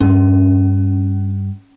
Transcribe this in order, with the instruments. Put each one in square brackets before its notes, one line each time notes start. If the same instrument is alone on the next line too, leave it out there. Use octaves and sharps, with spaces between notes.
[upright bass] G2 [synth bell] C#4